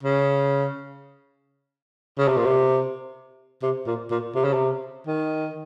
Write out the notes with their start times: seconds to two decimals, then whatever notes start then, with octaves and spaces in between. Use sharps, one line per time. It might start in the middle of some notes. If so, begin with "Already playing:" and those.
0.03 C#3
2.19 C#3
2.28 C3
2.37 A#2
2.46 C3
3.63 C3
3.87 A#2
4.11 A#2
4.35 C3
4.44 C#3
4.53 C3
5.07 D#3